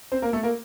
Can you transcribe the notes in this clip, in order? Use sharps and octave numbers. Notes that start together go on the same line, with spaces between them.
C4 C5
A#3 A#4
A3 A4
A#3 A#4